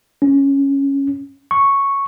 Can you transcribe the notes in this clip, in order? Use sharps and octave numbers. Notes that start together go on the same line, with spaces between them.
C#4
C#6